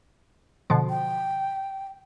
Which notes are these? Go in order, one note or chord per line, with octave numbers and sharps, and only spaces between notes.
B2 D3 F3
G5